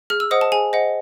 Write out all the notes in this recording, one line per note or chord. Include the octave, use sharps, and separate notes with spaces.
G#4 F6
E6
C5 D#5 F#5 D#6
A5
G#4 G#5
C5 D#5 F#5